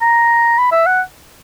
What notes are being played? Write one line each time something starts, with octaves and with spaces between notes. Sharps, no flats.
A#5
B5
E5
F#5